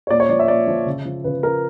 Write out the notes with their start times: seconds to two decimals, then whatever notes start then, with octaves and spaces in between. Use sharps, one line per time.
0.07 C#5
0.10 A#2 D5
0.20 C#5
0.29 F3 D5
0.39 E5
0.48 A#2 D5
0.67 F3
0.86 C#3
1.05 F3
1.24 C#3 B4
1.43 F3 A#4